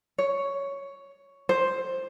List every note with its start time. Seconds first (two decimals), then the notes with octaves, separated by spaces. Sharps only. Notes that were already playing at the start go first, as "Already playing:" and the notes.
0.18 C#5
1.49 C5